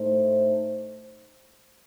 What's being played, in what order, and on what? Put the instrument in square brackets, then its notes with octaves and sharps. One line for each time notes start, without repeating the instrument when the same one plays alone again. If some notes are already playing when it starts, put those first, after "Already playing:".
Already playing: [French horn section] A2 A3 D#4 A4 C5